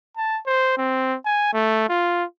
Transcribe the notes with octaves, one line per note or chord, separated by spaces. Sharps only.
A5
C5
C4
G#5
A3
F4